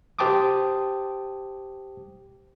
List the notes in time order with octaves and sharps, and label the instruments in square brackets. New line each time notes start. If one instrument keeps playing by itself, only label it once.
[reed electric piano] G4 C5 G5 A5 D6 D#6